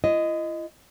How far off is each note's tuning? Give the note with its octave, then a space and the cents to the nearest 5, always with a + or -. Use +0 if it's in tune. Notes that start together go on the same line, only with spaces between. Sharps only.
E4 +45 D#5 +0